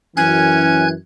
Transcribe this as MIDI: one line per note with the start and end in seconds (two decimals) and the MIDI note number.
0.17 0.94 42
0.17 0.94 52
0.17 0.87 61
0.17 0.88 80
0.17 0.88 90
0.17 0.88 92